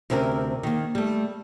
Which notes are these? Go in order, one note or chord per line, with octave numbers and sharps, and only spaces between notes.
D2 C3 C4 C#4 G4 A#4
D#3 A#3
G3 A3